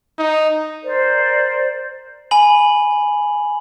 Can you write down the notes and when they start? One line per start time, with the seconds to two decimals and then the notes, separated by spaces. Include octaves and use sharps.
0.19 D#4
0.83 A#4 C5 D5
2.31 G#5 B5 F#7